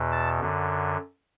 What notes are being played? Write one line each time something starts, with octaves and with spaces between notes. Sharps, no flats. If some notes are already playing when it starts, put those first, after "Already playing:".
Already playing: E2 B2
A5
F#2 D3